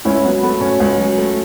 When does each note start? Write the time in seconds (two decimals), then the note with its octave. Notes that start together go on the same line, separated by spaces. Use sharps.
0.05 C#2 C#4 E4
0.25 F#3 B3
0.43 A3 B3
0.60 B2 C#4
0.80 C#2
0.98 F#3
1.17 A3